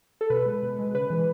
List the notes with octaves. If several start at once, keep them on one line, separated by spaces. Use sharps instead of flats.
A4
B2 B4
G#3
B2
G#3
C#3 B4
E3 G#3